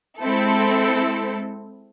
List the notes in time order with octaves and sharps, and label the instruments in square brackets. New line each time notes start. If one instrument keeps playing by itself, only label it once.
[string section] G#3 C4 E4 A4